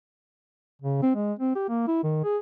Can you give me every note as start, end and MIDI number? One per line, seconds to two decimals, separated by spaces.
0.82 1.00 49
1.02 1.12 60
1.16 1.33 56
1.39 1.53 60
1.56 1.68 67
1.69 1.83 58
1.87 2.02 64
2.03 2.19 51
2.24 2.38 68